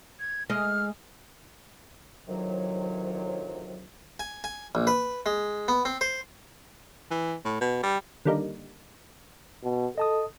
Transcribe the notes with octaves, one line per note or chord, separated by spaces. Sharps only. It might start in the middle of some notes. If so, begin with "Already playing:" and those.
G#6
G#3 D#5 F6
D2 C3 D#3 F3 F#3
G#5
G#5
A#1
B4
G#3
B3
C4
C5
E3
A2
B2
G3
D3 D#3 G3 A#3 D#4
B2
A4 D#5 A5 D#6